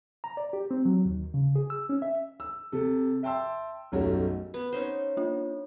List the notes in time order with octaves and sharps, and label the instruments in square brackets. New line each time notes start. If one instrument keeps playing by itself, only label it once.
[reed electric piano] A#5
D5
G4
C4
F#3
D#2
C#3
G#4
E6
C#4
E5
[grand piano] E6
C3 A4
E5 G5 A5 C6 E6
B1 F#2 F#3 G3 A3
[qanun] B3
C#4 D#4 C5
[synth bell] A#3 D4 F4